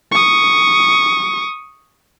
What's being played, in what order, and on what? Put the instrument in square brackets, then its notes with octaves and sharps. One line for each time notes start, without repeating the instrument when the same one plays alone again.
[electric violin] C#6 D#6